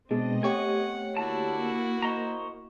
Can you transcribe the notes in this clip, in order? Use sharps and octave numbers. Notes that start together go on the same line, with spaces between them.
B2 G#3 B3 C4 D4 D#5
A3 G4 C#5 F#5 G#5 C#6
D3 A#3 E4 F#4 A5
C5 D#5 A#5 C#6